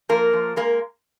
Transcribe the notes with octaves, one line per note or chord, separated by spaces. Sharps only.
F3 A#3 A#4
F3
G#3 A#3 A#4